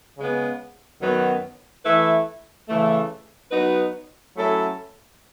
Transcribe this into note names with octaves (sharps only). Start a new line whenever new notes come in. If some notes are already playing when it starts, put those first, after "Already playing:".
C#3 G#3 B3
F#2 D#3 F#3 B3
E3 A3 E4 B4 E5
C#3 E3 A3
F#3 B3 D#4 F#4 B4
F#3 A3 C#4 E4 A4